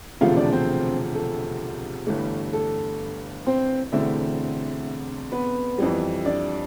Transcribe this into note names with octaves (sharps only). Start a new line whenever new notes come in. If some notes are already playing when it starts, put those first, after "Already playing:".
E1 D2 C3 F3 A3 F4 F5
D4 D5
C4 C5
A4
G1 G2 E3 A3
A4
C4 C5
E1 D2 D3 A3 C4 E4 E5
B3 B4
F2 E3 G3
D4 D5